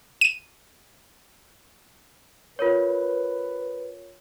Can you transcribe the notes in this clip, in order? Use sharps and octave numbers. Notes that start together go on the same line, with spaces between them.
D#7
F4 A#4 B4 C#5